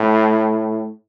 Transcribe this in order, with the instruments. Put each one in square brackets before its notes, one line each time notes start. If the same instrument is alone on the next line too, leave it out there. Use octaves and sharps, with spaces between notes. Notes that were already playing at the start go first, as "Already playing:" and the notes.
Already playing: [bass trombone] A2